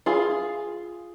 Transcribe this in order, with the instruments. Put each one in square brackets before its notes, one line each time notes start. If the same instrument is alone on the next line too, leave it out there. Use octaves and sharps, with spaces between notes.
[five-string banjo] F4 G#4 F5